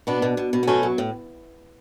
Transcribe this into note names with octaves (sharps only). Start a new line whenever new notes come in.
B2 B3 D4
B2
B2
B2
B3
F#3 A3 C#4
F#3
A2